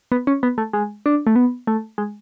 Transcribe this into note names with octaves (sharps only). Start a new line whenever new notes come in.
B3
C#4
B3
A3
G#3
D4
A3
B3
A3
G#3